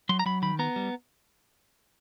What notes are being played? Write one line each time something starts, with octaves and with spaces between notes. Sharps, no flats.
F#3 C6
A#5
F#3 B5
D#3 B5
B3 A#5
G3